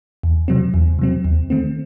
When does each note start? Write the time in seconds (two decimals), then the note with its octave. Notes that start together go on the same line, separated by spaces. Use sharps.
0.23 E2
0.48 C3 F#3 C4
0.74 E2
0.99 C3 F#3 C4
1.25 D#2
1.50 D#3 A3 C4